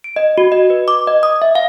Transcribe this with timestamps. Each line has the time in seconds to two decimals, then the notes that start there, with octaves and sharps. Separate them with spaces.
0.04 D7
0.16 D#5
0.38 F#4
0.52 D#5
0.70 B4
0.88 D6
1.07 D#5
1.23 D#6
1.42 E5
1.55 F5